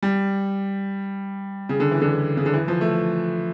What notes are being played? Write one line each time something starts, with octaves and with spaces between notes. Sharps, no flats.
G3
C#3
D3
E3
D3
C#3
D3
E3
F3
A3